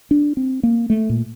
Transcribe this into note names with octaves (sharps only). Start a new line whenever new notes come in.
D4
C4
A#3
A3
A#2